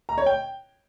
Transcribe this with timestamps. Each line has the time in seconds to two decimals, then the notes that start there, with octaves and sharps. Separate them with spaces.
0.09 A#5
0.18 C#5
0.26 G5